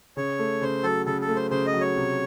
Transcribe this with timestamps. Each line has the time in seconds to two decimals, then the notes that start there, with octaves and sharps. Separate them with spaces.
0.17 C#3 C#5
0.39 A3
0.61 C#3 C5
0.83 F#3 A4
1.06 C#3 A4
1.21 A4
1.29 A3
1.36 C5
1.51 C#3 C5
1.66 D#5
1.73 F#3
1.81 C#5
1.96 C3